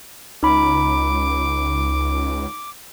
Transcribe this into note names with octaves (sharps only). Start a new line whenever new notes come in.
C#2 D#4 B5 D6